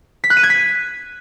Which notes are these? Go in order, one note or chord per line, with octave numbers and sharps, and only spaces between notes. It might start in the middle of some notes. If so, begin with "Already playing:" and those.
B6
F#6
D#7
G#6
B6